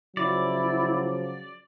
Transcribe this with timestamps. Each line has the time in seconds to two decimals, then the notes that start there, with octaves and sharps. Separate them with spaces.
0.17 C#3 F3 F#3 E4 D5